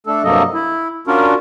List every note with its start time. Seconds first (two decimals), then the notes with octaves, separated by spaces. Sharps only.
0.07 A3 D4 A4
0.24 G2 C3 F#3 A#3 A4 D#5
0.54 E4
1.07 C#4 D4 F4 F#4 A#4